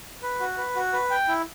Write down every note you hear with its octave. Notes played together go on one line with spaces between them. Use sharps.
B4
F#4
B4
F#4
B4
G5
E4